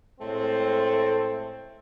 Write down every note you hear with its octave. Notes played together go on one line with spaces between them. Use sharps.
A2 G#3 A3 C4